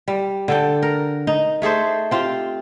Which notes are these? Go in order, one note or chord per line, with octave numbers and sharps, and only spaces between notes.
G3
D3 A4 G5
A#4
D#4
A3 G#4 A4 C5
C4 F4 G4